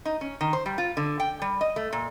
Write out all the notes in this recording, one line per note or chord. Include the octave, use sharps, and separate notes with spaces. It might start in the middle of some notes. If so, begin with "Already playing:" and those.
D#4
C#4
D#3
C5
G3
F4
D3
G5
G3
D#5
A3
A#2